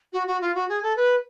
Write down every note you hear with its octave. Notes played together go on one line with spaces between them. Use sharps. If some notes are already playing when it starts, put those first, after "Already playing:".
F#4
F#4
F4
F#4
G#4
A4
B4